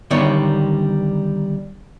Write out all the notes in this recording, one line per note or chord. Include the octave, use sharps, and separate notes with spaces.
D3 D#3 G3 B3 C#5